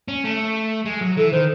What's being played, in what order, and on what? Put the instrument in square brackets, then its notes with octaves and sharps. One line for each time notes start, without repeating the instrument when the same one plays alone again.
[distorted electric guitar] C#4
A3
G#3
F#3
[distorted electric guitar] E3 [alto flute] A4
[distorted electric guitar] D#3 [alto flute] C5